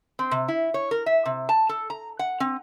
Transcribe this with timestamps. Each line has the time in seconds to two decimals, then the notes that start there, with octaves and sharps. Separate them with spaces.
0.19 C4
0.31 C3
0.48 E4
0.74 C#5
0.91 A#4
1.06 E5
1.26 C3
1.49 A5
1.69 A4
1.90 A#5
2.19 F#5
2.40 C4